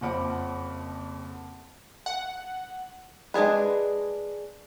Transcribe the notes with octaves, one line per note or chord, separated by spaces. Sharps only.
F#1 F2 C4 F#5 B5 D6
F#5
G#3 D4 G#4 B4